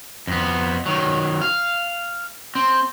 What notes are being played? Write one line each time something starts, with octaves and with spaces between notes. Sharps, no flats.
F2 B3
D#3 F#3
F5
C4